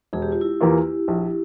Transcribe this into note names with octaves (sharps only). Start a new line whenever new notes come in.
E1 G#4
G4
F4
E4 G4
E2 E3 A#3 F4
A#1